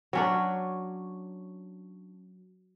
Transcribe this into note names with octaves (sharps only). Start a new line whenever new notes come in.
F#3 C#4 D4